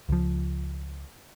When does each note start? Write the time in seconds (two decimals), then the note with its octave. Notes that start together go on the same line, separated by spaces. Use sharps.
0.09 C#2 F3